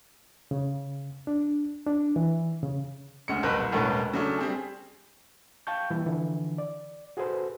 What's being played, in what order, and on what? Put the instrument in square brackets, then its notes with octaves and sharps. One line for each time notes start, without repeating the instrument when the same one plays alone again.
[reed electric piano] C#3
D4
D4
E3
C#3
[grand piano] D2 C#3 G#3 C#7
F#1 C2 F2 A#4 B4 F#6
C2
E1 B1 A2 A#3 C#4 B4
C#3 F#3 A3 D4
G3 C4 G#4
[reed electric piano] F5 G5 A5 C#6 G6
E3 G3 A#3 E4
D3 E3 F3
D5
F#4 G#4 A4 B4 C5